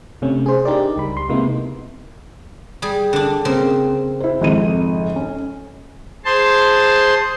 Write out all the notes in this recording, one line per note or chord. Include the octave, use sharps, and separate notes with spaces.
C3 A3 C#4
G#4 C5
D4 D#4 G4 A#4 D5
C#2 G3 B5
C6
C3 G#3 A#3 B3 D#4 E4
G3 G#4
D3 D4
C#3 A#3 C4
E4 C5
G#1 F2 D#7
C#4
G#4 C5 A5 C6